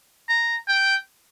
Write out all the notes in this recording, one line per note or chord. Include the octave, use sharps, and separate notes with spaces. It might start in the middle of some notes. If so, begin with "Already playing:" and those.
A#5
G5